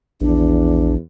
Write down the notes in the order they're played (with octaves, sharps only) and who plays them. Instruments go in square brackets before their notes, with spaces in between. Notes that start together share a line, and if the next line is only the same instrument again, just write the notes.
[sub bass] A#1 [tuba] E2 [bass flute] D4